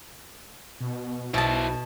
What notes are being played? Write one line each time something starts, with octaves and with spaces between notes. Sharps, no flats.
B2
B1 B2 E4 C5 A5